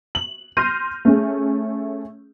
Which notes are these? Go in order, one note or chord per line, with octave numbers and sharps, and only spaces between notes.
F#7
C6 F6 G6 A#6 C7 D#7
A3 C#4 G#4